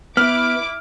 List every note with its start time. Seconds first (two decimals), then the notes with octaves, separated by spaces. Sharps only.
0.17 B3 E4 D6 F6